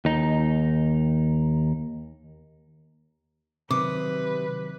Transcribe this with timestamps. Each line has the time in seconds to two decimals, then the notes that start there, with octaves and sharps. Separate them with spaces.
0.05 D#2 D#4
3.71 C3 D#3 F#3 B4 D6 D#6